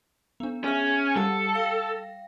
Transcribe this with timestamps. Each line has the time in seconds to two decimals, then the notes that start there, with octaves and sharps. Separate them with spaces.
0.40 B3 D4
0.64 C#4 G#4 E5
1.16 G3 G4 A4 F#5
1.55 F5 G5 A#6